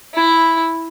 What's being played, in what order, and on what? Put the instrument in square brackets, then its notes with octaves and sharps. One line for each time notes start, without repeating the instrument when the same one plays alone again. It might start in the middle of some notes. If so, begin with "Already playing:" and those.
[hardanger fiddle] E4